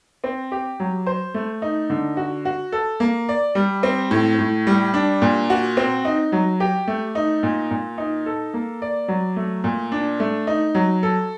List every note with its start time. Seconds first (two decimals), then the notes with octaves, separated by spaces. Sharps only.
0.24 C4
0.52 G4
0.80 F#3
1.06 C5
1.34 A3
1.62 D#4
1.90 D3
2.17 F#4
2.45 F#4
2.72 A4
3.00 A#3
3.29 D5
3.55 G3
3.83 C4
4.11 A2
4.39 A2
4.67 G3
4.94 D4
5.22 A#2
5.50 F#4
5.77 C4
6.05 D#4
6.32 F#3
6.60 G4
6.87 A3
7.15 D#4
7.43 A#2
7.71 A#2
7.98 D#4
8.26 A4
8.54 A#3
8.82 D5
9.08 F#3
9.36 A3
9.64 A#2
9.92 D4
10.20 A3
10.47 D#4
10.75 F#3
11.03 A4